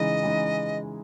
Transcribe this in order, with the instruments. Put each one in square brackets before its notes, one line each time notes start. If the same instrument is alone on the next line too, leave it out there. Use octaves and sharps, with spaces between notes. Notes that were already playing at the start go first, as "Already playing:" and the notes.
Already playing: [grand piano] C#3 E3 G#3 D#4 [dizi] D#5
[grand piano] C#3 E3 G#3 D#4